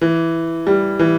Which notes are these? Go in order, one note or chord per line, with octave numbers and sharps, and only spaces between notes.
E3
G3
E3